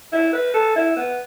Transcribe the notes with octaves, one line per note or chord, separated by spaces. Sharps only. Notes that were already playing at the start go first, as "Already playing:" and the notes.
E4
B4
A4
E4
B3